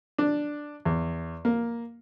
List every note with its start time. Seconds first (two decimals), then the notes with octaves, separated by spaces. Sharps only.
0.18 D4
0.85 E2
1.45 A#3